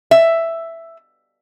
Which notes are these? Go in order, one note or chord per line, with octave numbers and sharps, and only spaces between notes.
E5